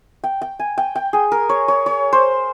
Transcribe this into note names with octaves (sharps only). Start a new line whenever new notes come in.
G5
G5
G#5
G5
G5
G#4
A#4
C#5
C#5
C#5
C5